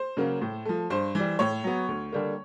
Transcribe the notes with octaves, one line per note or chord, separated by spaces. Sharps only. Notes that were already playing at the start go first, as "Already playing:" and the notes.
Already playing: C5
C#3 F#3 A#3 C#4
A2
F3 A3
G2 C5
E3 G3
A2 C#5
F#3 B3
D2
D3 G3 A#3